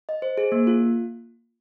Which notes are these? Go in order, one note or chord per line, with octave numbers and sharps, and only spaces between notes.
D#5
C5
G#4
A#3
F4